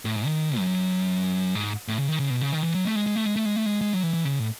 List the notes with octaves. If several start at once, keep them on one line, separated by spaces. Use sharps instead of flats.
A2
G#2
D#3
F#2
G#2
A2
C#3
D#3
C#3
B2
C#3
D#3
E3
F#3
A3
G#3
G#3
A3
G#3
A3
G#3
A3
G#3
G#3
F#3
E3
E3
C#3
A2